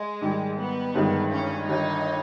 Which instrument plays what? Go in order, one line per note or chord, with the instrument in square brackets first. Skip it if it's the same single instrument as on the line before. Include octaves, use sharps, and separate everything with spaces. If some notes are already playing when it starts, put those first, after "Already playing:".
Already playing: [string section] G#3
[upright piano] G#2 D#3 G3
[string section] B3
[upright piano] G1 G2 D#3 G#3 D#4
[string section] C#4
[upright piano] G1 G2 D#3 [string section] D#4